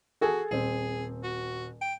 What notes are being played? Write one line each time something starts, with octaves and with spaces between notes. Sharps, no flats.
F#4 G#4 A4 G#5
D#1 C4 G#4
F#4
G5